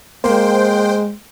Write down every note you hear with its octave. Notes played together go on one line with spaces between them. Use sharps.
G#3 A#3 C5 G5